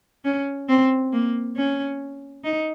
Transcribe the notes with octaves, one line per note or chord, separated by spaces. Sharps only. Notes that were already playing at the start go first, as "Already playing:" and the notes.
C#4
C4
A#3
C#4
D#4